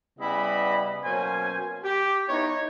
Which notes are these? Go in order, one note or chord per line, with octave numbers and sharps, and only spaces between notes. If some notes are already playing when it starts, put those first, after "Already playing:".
C#3 G3 B3 E4 D#5 B5
B2 F#3 A#3 C#4 C5 G#5
G4
B3 D#4 E4 C#5